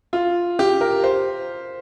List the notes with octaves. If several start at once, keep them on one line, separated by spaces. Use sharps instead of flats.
F4
G4
A#4
C5